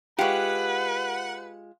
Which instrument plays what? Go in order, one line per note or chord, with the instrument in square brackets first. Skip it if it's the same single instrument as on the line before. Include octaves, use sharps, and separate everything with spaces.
[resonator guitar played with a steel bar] G#3 F4 [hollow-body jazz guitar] G4 [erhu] B4 [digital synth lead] F#5